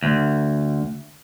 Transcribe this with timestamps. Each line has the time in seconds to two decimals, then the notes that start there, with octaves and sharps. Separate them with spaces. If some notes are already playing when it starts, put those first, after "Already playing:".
0.03 D2